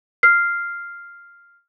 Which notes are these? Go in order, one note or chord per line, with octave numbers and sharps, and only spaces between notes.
F6 C7